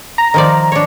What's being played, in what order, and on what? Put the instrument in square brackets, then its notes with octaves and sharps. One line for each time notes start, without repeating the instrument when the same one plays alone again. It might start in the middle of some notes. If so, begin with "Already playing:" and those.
[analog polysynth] A#5
[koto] D#3 F3 D5
D4 C#5